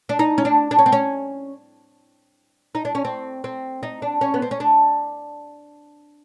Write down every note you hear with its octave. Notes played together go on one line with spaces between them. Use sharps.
D4
D#4
C#4
D4
D4
C#4
C4
C#4
D#4
D4
C#4
C4
C4
D#4
D4
C#4
B3
C4
C#4
D4